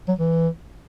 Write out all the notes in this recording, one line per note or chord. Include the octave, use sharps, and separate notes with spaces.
F#3
E3